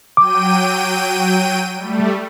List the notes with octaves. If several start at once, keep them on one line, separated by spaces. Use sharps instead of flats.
F#3 G5 D6 D#7
G3 A3